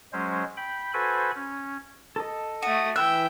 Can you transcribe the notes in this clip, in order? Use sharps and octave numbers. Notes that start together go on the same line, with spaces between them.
F#3 G#3 C#4 C5
G5 B5
F#4 A4 B4 C5 G#5 B5
C#4
A4 D#5
A3 F#4 D#6
E3 E5 G5 B5 F#6